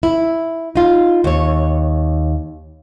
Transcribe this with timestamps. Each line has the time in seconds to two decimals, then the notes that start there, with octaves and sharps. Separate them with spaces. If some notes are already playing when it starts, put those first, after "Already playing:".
0.03 E4
0.75 D#4 F4
1.24 D#2 C#5